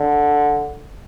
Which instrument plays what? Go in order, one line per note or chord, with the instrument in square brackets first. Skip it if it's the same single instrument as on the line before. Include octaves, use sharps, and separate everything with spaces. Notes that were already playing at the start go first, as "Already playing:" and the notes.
Already playing: [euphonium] D3